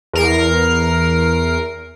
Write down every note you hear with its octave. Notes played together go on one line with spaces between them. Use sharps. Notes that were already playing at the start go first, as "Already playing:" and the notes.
E2 A#4 C7